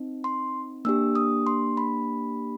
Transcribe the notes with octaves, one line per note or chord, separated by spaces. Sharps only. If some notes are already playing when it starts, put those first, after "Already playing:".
Already playing: C4 D#4
C6
A#3 D4 G4 E6
D#6
C6
B5